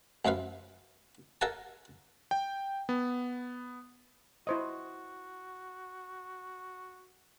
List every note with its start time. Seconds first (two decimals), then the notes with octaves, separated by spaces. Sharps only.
0.25 A1 F#2 F3 B4 F5
1.41 A4 A#4 F5 F#5 G#5 A5
2.31 G5
2.89 B3
4.47 E4 F#4 C5 D#5